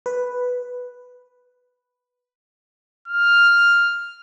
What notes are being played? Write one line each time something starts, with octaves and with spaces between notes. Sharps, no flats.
B4
F6